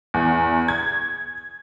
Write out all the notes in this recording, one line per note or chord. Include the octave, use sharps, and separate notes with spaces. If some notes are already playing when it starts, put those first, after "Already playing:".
E2
G#6